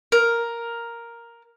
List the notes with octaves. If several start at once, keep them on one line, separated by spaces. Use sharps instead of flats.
A#4